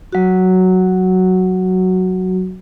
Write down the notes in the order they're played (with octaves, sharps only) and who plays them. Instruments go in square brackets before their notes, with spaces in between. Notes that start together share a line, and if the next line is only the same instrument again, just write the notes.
[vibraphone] F#3 F#4